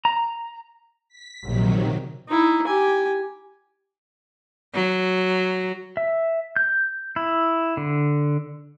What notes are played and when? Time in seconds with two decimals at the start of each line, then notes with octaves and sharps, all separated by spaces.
0.05 A#5
1.09 B6
1.45 A#1 C3 D#3 F#3
2.29 D#4 E4
2.67 G4 G#5
4.74 F#3
5.97 E5
6.56 G6
7.16 E4
7.77 D3